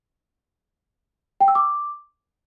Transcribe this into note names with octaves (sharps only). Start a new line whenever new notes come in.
G5
E6
D6